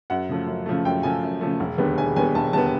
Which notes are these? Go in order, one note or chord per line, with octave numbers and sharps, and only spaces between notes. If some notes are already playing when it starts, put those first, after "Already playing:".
F#2 F#5
C#3 F3 A3
F#2
C#3 F3 A3
F#2 G5
C#3 F3 A3 G#5
F#2
C#3 F3 A3
E1
D#2 D3 G3 B3
E1 G#5
D#2 D3 G3 B3 G#5
E1 A5
D#2 D3 G3 B3 A5